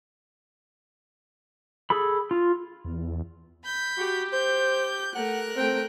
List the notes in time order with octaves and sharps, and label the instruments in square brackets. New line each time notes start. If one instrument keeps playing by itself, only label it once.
[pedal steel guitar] G#4 A4 B5
F4
[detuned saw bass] E2
[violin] B5 G6
[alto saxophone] F#4 [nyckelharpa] G4
[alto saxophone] C5 [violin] G6
[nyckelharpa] A3 [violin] A#4 F#6 [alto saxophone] F#5
[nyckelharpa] A3 G5 [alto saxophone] C4